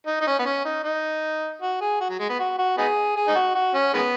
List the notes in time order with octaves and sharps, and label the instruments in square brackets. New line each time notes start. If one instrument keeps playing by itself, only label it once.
[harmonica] D#4
D#4
C#4
B3
C#4
D#4
D#4
F#4
G#4
F#4
F#3
G#3
B3
F#4
F#4
B3 D#4 G#4
G#4
D#4
F#4
F#4
C#4
D#3 G#3 B3